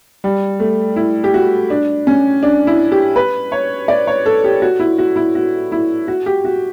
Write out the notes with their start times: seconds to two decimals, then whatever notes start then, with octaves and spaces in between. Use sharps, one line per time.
0.24 G3
0.60 A3
0.96 E4
1.24 G4
1.34 F#4
1.70 D4
2.07 C#4
2.43 D4
2.67 E4
2.92 G4
3.16 B4
3.52 C#5
3.88 D5
4.07 C#5
4.26 A4
4.44 G4
4.62 F#4
4.80 E4
4.98 F#4
5.16 E4
5.35 F#4
5.72 E4
6.08 F#4
6.26 G4
6.45 F#4